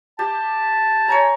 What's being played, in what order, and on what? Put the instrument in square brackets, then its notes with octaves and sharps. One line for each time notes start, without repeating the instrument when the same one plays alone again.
[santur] G4 [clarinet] A5
[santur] C#5 G#5 A#5